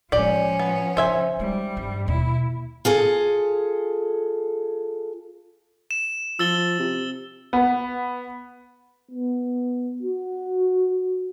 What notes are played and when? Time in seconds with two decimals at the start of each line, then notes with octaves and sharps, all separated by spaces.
0.12 A2 F3 G#3 C#4 G4 D5
0.59 B3
0.97 C#3 C5 E5 G#5
1.40 G3 G#3 D#4
1.77 G2
2.08 D#2 B2 E4
2.85 F4 G#4 A4
5.91 E7
6.39 F3 E6 A6 G7
6.80 C3
7.53 B3 B4
9.11 B3
10.02 F#4